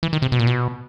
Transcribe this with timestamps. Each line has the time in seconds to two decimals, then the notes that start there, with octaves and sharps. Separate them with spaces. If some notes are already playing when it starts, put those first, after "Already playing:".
0.03 E3
0.13 D#3
0.22 C3
0.32 B2
0.39 A#2
0.47 B2